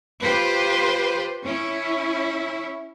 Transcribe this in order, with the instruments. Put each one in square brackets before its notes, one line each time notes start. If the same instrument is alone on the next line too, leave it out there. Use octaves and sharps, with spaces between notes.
[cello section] F4 G4 B4 C5
C#4 E4